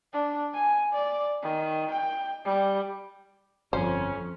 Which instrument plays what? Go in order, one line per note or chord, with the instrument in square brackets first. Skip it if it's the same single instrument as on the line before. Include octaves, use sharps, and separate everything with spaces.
[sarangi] D4
G#5
D5
D#3
G5
G3
[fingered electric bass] G1 F3 [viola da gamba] F2 [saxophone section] C#4 [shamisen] C5